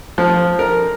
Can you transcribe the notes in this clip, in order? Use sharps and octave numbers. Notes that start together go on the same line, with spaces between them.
F3
A#4